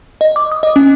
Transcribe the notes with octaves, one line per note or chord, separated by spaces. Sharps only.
D#5
D6
D#6
D#5
C#4